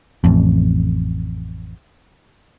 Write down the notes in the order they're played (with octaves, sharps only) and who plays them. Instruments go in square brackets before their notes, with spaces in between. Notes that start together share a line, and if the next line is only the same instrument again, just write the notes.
[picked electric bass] A1 F2